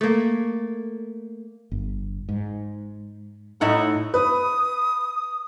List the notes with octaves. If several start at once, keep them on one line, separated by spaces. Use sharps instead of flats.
A3 A#3
G1
G#2
A2 D#4 E4 F#5
B4 D#6